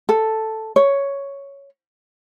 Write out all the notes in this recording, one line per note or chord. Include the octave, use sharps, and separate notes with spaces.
A4
C#5